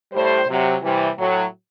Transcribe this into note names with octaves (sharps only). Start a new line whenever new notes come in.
A2 G3 C5
C3 F#3
C3 E3 G3
A2 F#3